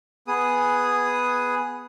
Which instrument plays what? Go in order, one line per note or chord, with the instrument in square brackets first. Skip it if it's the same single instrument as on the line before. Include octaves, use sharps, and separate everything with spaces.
[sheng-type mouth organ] B3 G#4 D#6